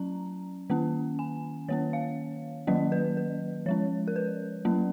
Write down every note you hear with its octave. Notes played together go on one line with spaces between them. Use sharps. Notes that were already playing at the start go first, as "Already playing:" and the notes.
Already playing: F#3 C#4 A#5
D#3 A#3 C#4
G#5
D#3 A#3 C#4 C#5
F5
D#3 F#3 A#3 C#4 D#5
B4
B4
F3 G#3 C#4 C#5
A#4
B4
F#3 A#3 C#4